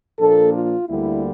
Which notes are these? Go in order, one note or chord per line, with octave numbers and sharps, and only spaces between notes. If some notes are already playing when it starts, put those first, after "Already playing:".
A#2 F3 A#3 D4 A4
F4
D2 D3 G3 A#3 E4